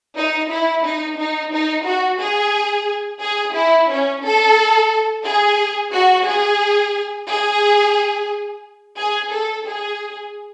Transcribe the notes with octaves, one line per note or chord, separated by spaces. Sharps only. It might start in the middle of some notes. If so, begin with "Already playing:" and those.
D#4
E4
D#4
D#4
D#4
F#4
G#4
G#4
E4
C#4
A4
G#4
F#4
G#4
G#4
G#4
A4
G#4